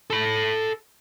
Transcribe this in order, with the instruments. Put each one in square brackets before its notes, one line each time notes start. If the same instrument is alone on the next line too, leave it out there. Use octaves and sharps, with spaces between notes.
[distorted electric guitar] A4 B5